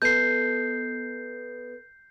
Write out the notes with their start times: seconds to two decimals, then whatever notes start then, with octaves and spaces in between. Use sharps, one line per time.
0.02 B3 A4 D#5 G6 C7